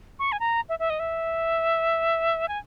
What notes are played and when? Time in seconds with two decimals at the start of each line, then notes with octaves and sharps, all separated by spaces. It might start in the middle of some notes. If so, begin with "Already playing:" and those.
0.19 C#6
0.32 G#5
0.40 A#5
0.69 E5
0.79 E5
0.90 D#5
0.99 E5
2.48 G#5